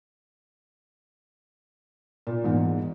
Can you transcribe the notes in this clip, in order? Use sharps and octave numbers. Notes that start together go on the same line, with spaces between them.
A#2
E2 G#2